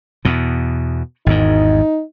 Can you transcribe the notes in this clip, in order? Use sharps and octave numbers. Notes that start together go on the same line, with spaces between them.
E2 B2
G#1 E2 G#2 D#4